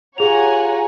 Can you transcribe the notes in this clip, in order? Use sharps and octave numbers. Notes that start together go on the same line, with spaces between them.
F4 G4 G#4 C#5 F#5 G#5 A#5 F7